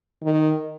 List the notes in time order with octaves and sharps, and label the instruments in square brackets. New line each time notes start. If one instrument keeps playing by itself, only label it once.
[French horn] D#3